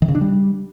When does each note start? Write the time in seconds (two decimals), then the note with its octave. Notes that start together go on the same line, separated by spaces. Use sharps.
0.02 D#3
0.08 C#3
0.15 D4
0.21 G3